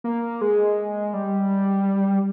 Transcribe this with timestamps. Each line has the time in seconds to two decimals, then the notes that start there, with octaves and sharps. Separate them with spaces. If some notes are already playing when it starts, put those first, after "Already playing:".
0.04 A#3
0.41 G#3
1.14 G3